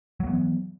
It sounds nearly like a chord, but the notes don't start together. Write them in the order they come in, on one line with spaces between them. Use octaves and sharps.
F#3 A#3 B3 E3